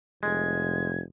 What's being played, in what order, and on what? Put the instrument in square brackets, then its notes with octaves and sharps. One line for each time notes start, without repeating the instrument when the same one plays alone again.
[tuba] F1 [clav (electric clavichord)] G#3 [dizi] G#6